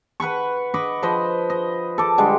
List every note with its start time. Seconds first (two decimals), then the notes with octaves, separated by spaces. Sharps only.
0.20 B4 F#5 B5 C#6
0.74 D#5 B5 C#6 D6
1.03 F3 B4 C5 D#5
1.50 D#5
1.98 A4 D6
2.18 D3 G3 G#3